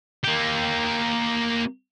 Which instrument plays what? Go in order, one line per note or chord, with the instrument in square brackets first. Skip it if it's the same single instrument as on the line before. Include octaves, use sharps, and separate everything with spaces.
[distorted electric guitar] A#3 G4